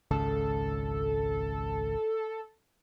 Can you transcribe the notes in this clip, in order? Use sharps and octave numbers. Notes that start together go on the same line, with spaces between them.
G#1 C#2 C#3 A4